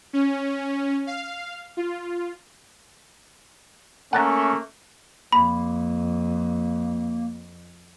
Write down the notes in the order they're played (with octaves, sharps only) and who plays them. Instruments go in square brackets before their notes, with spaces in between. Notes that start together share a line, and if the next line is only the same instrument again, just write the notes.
[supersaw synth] C#4
F5
F4
[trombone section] A3 A#3 C#4 [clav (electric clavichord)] F#5 A5 A#5
[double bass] F2 [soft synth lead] A#3 [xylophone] B5